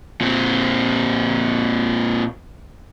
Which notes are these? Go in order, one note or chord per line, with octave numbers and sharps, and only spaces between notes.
A#2 C4